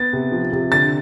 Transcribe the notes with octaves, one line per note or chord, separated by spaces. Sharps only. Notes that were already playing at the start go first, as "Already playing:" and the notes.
Already playing: B3 A6
C3
F3
C3
D3 A6